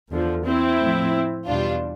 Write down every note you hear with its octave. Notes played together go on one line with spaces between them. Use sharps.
E2 D3 F3
C4 E4
A2 F3
E2 B2 G3 D4 F4